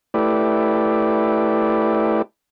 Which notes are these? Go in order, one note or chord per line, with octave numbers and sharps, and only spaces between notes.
A3 E4 G4 B4 D5